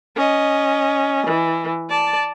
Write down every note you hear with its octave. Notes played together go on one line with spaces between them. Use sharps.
C#4 D#5
E3
D5 A5